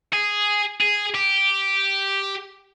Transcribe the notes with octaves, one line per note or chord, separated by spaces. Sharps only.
G#4
G#4
G4